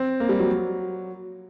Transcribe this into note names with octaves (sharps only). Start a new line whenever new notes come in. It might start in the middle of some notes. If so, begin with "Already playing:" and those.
Already playing: C4
A#3
G3
F#3